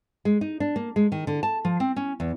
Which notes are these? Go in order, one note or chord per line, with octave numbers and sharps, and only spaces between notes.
G#3
D#4
D4
A#3
G#3
D#3
D3
A5
F3
C4
C#4
E2